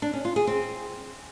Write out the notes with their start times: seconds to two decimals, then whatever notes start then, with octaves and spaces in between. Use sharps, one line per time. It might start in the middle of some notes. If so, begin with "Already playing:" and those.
0.02 D4
0.13 C#4
0.25 F4
0.36 G#4
0.47 C4